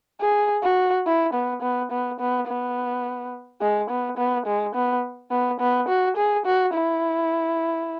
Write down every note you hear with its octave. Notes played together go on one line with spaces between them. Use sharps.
G#4
F#4
E4
B3
B3
B3
B3
B3
G#3
B3
B3
G#3
B3
B3
B3
F#4
G#4
F#4
E4